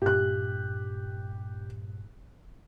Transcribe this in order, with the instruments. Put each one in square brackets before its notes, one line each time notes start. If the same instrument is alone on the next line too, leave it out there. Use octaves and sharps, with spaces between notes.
[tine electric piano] G2 A#2 [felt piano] G4 F#6